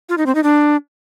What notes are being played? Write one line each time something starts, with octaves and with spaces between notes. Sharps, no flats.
F4
D#4
C4
D#4
D4